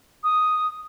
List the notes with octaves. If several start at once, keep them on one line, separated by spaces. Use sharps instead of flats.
D#6